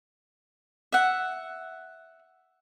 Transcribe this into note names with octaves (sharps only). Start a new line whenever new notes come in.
E5 F#5